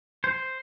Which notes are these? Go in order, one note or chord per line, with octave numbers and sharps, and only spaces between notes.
C5